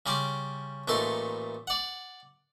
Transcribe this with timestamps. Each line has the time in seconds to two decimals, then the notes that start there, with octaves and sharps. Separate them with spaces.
0.06 C#3 G3 A#5 C6 D6
0.88 A1 A#2 A3 D#4 A4 C6
1.67 D5 F#5